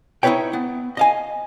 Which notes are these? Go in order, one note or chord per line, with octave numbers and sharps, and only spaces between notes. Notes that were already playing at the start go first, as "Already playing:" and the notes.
D#4 E4 F#4 B4 C#5 G5
B3
D#5 F5 G#5